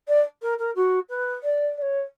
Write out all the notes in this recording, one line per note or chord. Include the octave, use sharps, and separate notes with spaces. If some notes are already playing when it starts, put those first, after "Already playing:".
D5
A#4
A#4
F#4
B4
D5
D5
C#5